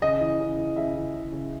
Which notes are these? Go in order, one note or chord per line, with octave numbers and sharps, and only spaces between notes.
C#3 D#5
E3
C#3
E3
C#3 E5
E3
C#3
C#3